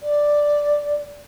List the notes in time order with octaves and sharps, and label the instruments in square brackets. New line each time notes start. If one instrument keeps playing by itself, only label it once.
[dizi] D5